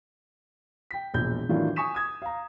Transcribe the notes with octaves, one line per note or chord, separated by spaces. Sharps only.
G5 B6
E1 A#1 G6
A2 D#3 E3 F#3 D4 F4
G#5 C#6 D#6 B6 E7
D#6 G#6
F5 A#5